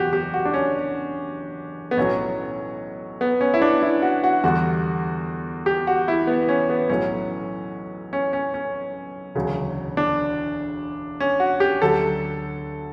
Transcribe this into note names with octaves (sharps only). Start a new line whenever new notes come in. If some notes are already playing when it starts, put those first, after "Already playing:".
Already playing: F#1 E2 B2 F#4 G4
G4
F#4
D4
C#4
B3
B1 A2 F#3 C#4
B3
C#4
E4
D4
E4
F#4
F#4
E2 D3 G3 F#4
G4
F#4
E4
B3
C#4
B3
B1 A2 F#3 C#4
C#4
C#4
C#4
E1 D2 C#3 F#3
D4
C#4
F#4
G4
D2 D3 F#3 A4